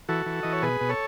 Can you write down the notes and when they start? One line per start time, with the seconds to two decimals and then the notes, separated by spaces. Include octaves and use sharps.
0.09 E3 F#4 A4
0.26 E3
0.43 E3 D#5
0.52 C#5
0.62 B2 G#4 B4
0.81 B2
0.89 A4 C#5